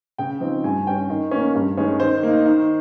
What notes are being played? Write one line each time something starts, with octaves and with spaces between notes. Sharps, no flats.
C#3 G5
F3 C4 D#4
G2 G#5
G3 C#4 G5
D#3
A#3 C#4
G2
D#3 G#3 C#4
D#3 C5
A#3 D#4
D#3